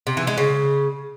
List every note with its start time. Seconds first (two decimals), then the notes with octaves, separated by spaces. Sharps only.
0.07 C3
0.17 E3
0.27 G#3
0.38 C#3